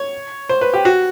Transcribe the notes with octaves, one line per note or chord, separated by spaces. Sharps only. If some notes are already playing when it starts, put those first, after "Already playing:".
Already playing: C#5
C5
B4
G4
F#4